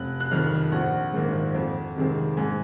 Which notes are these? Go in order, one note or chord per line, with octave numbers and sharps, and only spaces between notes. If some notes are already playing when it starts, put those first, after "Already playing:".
Already playing: F1 F#6
F#6
F2 D#3 F6
A#1 F#5
G#2 D#3 A#3
F2
C3 D#3 G#3 C4
G#2 G#5